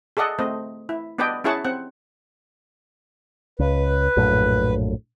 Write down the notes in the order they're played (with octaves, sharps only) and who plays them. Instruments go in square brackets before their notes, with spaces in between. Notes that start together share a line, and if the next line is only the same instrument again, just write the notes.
[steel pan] G#4 A4 D5 D#5 F#5
A3 C4 C5 D#5
E4
B3 D4 B4 D5 D#5 G5
C#4 E4 G#4 C#5 F#5 A5
C4 F#5
[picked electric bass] C#2 [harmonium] B4
[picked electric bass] A#1 F#2 A2